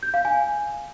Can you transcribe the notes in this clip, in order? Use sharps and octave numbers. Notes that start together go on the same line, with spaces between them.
G6
F5
G#5